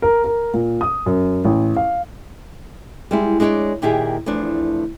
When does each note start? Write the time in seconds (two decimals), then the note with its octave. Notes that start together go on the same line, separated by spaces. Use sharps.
0.02 A#4
0.24 A#4
0.54 A#2
0.81 D#6
1.06 F#2
1.45 A1
1.76 F5
3.11 G3 G#3 E4
3.40 G#3 D4 F#4 C#5 D5
3.82 A#2 D#3 E4 G4 G#4
4.26 E2 F3 A3 D4